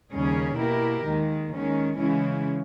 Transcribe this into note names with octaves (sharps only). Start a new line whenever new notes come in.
D#2 C#3 G3 C#4 G#4
B2 A#3 E4 G4 A#4
D#2 D#3 G#3
D#3 G#3 C#4
C#3 E3 G#3 C#4 E4